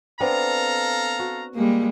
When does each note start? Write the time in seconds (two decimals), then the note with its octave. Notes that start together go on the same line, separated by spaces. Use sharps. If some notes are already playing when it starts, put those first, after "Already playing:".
0.20 B3 C4 D4 A4 F5 A#5
1.19 F#4
1.55 G3 G#3 A#3